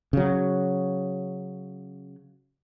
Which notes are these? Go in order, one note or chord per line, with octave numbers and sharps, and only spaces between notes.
C#3 F#3